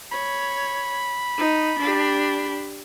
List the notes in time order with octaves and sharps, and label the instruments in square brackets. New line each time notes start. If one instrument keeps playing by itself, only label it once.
[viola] C#5 [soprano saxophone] B5
[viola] D#4
D4 G4